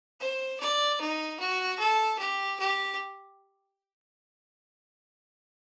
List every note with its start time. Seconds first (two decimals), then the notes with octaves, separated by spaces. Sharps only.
0.20 C5
0.60 D5
1.01 D#4
1.40 F#4
1.79 A4
2.19 G4
2.59 G4